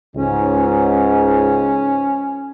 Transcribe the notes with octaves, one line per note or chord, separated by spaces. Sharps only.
C#2 G#2 C#4